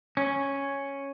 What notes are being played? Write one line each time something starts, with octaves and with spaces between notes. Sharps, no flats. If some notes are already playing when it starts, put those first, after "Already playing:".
C#4